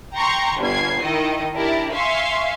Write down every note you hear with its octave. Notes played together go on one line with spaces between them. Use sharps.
G5 A#5 C6 C#6
G1 F4 G#6 C7
D#3 E4 D#5
D4 E4 G4 A#4 A5
E5 F5 G#5 C6 C#6